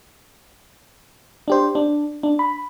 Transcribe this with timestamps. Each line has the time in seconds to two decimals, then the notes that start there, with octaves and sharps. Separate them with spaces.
1.48 D4 G4 C5
1.75 D4
2.23 D4
2.39 B5